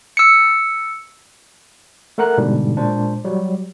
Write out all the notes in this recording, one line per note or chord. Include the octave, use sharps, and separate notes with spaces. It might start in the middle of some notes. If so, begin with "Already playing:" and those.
E6 C#7
A3 A#4 F#5 A#5 F#6
G#2 B2 D3 G3 D4
A#2 G#3 D4 C5
F#3 G3